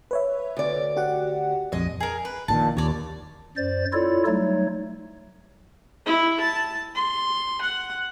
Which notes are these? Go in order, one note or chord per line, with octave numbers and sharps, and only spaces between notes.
B4 C#5 E5
D2 D5
F#4 G4 F#5
A#1 F2 G#3 D#5
G#4 A#4
B4
A#1 A#2 D#3 A5
D#2 C#5 D5
F#2 C5 D5 A6
E4 F4 A4 C#5 D5
F#3 G3 A3 D#4 C#5
E4
A5
C6
F#5